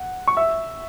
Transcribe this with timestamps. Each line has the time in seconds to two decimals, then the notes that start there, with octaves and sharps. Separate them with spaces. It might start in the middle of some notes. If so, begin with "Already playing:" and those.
Already playing: F#5
0.27 C#6
0.37 E5 E6